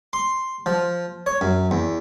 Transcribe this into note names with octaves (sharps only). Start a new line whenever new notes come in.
C6
F3
C#5
F#2
E2